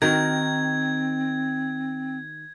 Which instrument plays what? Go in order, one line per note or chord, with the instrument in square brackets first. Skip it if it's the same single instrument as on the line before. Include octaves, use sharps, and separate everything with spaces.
[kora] D#3 F#4 A#4 [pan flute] C4 [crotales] G#6